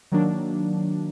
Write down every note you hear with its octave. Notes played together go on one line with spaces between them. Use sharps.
D#3 F#3 A#3 D4